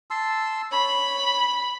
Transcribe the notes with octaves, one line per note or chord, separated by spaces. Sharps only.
A5 C6 E6
C#5 B5